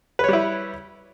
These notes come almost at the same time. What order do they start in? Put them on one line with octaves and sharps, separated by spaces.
B4 C#5 G3 E4